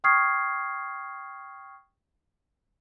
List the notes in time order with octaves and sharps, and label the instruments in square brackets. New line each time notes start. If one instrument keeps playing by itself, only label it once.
[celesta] G5 C#6 D#6 F6 G#6 C7